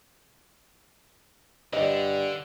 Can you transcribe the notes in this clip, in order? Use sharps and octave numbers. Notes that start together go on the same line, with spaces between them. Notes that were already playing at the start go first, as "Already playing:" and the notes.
G2 D3 D5 D#5